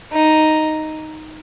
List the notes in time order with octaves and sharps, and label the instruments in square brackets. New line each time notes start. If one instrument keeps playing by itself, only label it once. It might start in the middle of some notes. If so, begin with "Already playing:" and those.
[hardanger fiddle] D#4